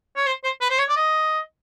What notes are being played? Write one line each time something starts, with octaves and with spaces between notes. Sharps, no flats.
C#5
C5
C5
B4
C5
C#5
D5
D#5